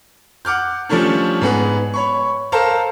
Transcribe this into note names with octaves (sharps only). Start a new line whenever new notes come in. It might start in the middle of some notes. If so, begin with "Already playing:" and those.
F#5 D6 F6 G6
F3 G3 A3 C#4 D4
G#2 B3 G#4
C#5 B5 C#6
A4 A#4 C5 F5 A5 A#5